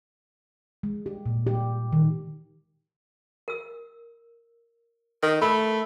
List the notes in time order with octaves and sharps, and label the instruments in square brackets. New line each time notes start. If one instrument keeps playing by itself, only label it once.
[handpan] G#3
G4
A#2
G4
D#3
[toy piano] A#4 E6
[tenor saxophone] D#3
[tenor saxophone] A3 [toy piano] A#4 B5